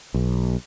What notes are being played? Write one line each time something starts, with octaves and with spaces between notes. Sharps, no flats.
B1